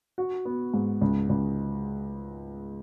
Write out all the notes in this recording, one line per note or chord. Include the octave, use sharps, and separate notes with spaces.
F#4
B3
G#2
C#2
C#2